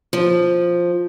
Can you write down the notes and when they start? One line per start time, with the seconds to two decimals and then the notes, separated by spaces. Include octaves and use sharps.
0.13 F3